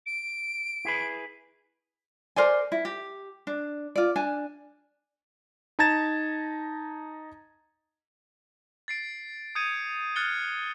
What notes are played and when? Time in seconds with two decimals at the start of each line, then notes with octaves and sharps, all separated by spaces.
0.06 D7
0.85 E4 G#4 B4
2.36 A#4 C5 D5 G#5
2.72 E4
2.85 G4
3.47 D4
3.96 F4 D5
4.16 D4 G#5
5.79 D#4 A5 A#5 G#6 A6 E7
8.88 A6 C7 D7
9.55 D#6 G6 G#6 C#7 D#7
10.16 F6 F#6 A6 C#7 G7